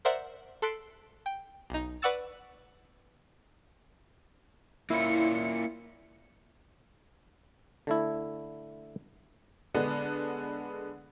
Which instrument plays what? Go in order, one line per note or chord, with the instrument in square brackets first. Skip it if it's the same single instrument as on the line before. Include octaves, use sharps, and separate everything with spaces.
[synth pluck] A#4 C5 D5 E5 F#5
A4 C6 F#6 B6 C7 D7
G5
B1 D#4
B4 D5 F#5 C#6 E6 A6
[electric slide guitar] A#3 C#4 F4 [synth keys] E4 C#7
[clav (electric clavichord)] D3 A3 E4
[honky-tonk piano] D3 G#3 B3 D4